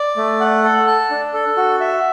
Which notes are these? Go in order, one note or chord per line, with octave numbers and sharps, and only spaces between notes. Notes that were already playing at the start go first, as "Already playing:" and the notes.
Already playing: D5
A3
F#5
A4
A5
D4
A4
F#4
E5